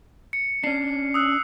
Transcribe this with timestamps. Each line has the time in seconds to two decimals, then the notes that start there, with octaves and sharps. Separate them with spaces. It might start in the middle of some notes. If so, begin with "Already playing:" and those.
0.33 C#7
0.64 C#4 D4 C7
1.14 D#6 E6 F#6